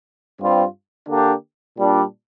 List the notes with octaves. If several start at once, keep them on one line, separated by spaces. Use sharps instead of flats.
G2 G3 C4 F4
D3 A#3 D4 G4
A#2 G3 D4